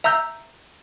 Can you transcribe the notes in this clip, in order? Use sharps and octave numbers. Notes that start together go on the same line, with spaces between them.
E5 A#5 E6 G6